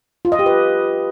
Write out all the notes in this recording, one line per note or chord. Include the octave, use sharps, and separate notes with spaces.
F4
D#5
G4
B4